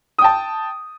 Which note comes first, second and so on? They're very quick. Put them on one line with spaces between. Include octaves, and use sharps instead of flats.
D#6 G5 A5